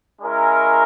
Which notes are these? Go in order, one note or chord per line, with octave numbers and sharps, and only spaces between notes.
G#3 C#4 E4 A#4